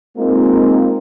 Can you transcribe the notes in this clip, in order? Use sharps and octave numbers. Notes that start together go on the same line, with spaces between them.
G#3 A#3 C4 D#4 F4 A#4